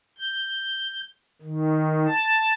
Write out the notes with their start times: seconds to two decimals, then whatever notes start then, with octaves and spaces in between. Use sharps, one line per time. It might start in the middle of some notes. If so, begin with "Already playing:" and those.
0.19 G6
1.42 D#3
2.07 A5